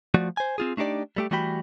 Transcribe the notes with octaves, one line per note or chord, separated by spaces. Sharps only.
F3 A3 F#4 D5
C5 G#5
C4 F4 G#4
A3 D4 D#4 G4 D5
G3 A3 G4
E3 G3 A3 F#4 G5 B5